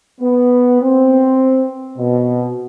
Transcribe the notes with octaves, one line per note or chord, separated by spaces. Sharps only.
B3
C4
B2